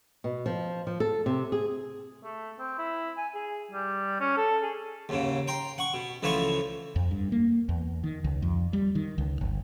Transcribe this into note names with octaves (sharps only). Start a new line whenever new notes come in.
B2
F3
F3
A4
C3
G#4
A3
C4
E4
G#5
G#4
G3
C#4
A4
G#4
D#2 G#2 C#3
G5 A#5 C6
F#5 C#6
B2
C#2 E3 F3 A3 F5 C#6
F2
G2
A#3
E2
D#3
C#2
F2
G3
D#3
C#2
G1